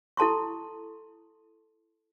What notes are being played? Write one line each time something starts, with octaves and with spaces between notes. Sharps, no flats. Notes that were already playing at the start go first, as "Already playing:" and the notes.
E4 A4 A5 C6 C#6